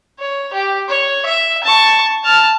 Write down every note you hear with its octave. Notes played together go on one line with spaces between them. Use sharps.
C#5
G4
C#5
E5
A5 C#6
A5 F6